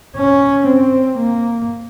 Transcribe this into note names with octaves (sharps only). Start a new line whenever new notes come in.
C#4
C4
A#3